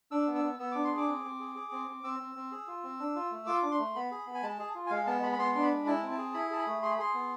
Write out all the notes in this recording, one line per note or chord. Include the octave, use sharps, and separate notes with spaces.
D4 E6
B3
E6
B3
B3 E6
D4 D6
C6
G#4
D6
C4
C4
G#4
G#4
C4
C4
C4 E6
C4
C4
G#4
F4
C4
D4
F4
A3
F4 D6
D4
C6
A3
B3 B5
G#4
B3
G#5
G#3 A5
G#4
F4
G#5
G#3 F5
B3 A5
G#3 B5
B5
B3 C6
D4 C6
B5
G#3
E4 A5
C4
A5
G#4
E4 B5
G#4 A5
B5
A3
G#4 C6
B5
G#4 C6
B3